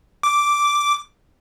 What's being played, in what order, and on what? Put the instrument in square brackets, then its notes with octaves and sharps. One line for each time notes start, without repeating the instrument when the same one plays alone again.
[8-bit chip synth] D6